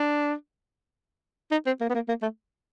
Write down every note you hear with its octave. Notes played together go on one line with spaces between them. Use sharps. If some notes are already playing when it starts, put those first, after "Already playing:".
Already playing: D4
D#4
C4
A#3
B3
A#3
A#3
A3